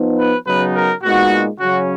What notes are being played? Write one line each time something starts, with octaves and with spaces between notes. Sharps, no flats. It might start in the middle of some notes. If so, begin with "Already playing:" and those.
Already playing: F3 B3 D#4
B4
C#3 F#3 B3 D#4 B4
A#4
A#2 G#3 B3 D#4 F#4
C#3 F#3 C#4 F#4